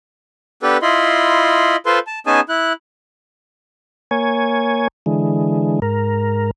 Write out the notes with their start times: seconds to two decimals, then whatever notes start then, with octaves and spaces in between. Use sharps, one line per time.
0.63 B3 D4 G4 A4 B4
0.82 E4 F4 D#5 B5 C6
1.86 F4 A4 B4 C5 C6
2.07 A5
2.27 B3 C#4 D#4 G#4 G#5 A5
2.49 E4 F#6
4.11 A#3 C#5 G#5
5.06 D3 E3 G#3
5.82 G#2 A#4